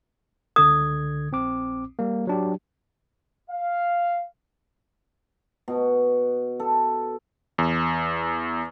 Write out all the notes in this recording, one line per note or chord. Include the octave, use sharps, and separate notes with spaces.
C#2 D3 D#6 G#6
A#1 C4 D6
G3 A#3
F#3 D4 G4
F5
B2
A4
E2